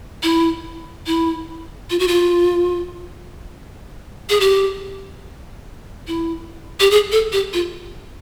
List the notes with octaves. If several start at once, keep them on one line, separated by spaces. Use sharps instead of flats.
E4
E4
F4
F#4
F4
G#4
G4
E4
G4
G#4
A4
G4
F4